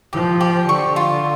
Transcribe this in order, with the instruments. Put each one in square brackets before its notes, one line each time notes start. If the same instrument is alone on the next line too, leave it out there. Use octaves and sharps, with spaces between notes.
[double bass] F3 [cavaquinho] G4
[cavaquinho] G4
[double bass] D3 [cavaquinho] C#6
[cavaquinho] F4